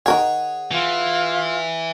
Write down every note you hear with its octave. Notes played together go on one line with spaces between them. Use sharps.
D#3 G#4 A#4 C#5 F#5 G#5
E3 F4